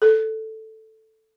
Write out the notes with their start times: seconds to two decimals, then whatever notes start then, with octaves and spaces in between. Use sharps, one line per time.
0.02 A4